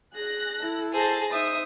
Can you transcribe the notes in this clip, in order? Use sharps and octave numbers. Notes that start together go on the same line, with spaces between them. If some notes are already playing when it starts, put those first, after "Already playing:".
G#4 F#6 A#6
E4 A4
G#4 C5 A5 A6 A#6
D#4 C5 E5 D#6